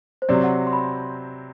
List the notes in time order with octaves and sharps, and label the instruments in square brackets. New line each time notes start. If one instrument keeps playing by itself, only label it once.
[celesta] C5
[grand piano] C3 F#3 C4 [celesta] D5
[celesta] F#5
C6
B5